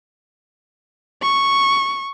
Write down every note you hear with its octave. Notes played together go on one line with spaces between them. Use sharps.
C#6